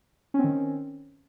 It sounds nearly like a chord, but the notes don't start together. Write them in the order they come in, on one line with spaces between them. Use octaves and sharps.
C#4 C4 D#3